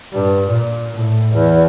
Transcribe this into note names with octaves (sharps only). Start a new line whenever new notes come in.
G2
A#2
A2
E2